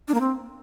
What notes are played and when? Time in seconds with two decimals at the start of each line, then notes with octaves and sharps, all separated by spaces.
0.08 D4
0.14 A#3
0.20 C4